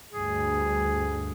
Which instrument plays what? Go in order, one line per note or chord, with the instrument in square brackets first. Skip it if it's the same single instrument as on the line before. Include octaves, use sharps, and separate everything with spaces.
[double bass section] D2 G2 [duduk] G#4